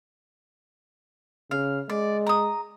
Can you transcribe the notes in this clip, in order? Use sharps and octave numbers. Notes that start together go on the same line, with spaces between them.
C#3 F5
G#3 D5
A#5 D#6